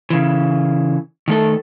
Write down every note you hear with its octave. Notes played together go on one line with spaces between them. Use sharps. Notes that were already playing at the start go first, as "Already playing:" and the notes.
C#3 E3
D#3 A3 A4